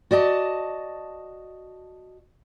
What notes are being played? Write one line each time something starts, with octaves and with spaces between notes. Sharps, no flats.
F#4 D5 D#5 A5